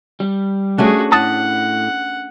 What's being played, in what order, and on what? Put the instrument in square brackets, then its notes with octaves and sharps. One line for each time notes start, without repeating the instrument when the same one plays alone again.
[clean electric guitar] G3
[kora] A3 C#4 D4 [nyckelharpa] F#4 G#4
[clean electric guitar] A2 [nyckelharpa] F#5 [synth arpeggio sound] A5 D#6 A6